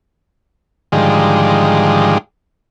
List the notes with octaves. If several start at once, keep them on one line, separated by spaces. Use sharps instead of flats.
G#2 D3 D#3 F3 G3 G#3